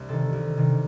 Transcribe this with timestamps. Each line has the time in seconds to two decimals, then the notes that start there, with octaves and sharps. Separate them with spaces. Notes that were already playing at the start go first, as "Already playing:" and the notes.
Already playing: C2
0.09 C3 D#3 A4
0.33 C2
0.57 C3 D#3